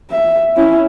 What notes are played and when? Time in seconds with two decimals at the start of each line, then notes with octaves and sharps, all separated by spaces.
0.11 E5
0.56 C#4 E4